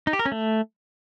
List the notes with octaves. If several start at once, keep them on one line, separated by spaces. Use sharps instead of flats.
D#4
G4
A#4
C#4
A3